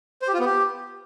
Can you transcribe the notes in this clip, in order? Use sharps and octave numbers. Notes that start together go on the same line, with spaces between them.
C5
G4
F4
B3
G4